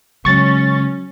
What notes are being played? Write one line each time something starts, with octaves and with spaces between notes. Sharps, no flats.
C#3 F#3 G#3 C#4 C#6 A6